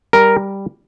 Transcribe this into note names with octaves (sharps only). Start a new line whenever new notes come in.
G3 A#4